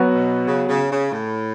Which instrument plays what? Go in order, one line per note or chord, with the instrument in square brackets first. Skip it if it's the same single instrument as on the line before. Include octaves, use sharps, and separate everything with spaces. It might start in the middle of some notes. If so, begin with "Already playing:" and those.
Already playing: [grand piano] F#3 B3 F#4
[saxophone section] B2
C#3
C#3
C#3
A2